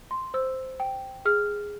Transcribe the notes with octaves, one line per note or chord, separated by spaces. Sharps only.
C6
C5 E6
G5
G#4 F6